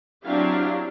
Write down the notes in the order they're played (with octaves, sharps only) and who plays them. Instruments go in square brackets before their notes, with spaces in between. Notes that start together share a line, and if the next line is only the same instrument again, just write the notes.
[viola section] F#3 C4 D4 E4 G4 F5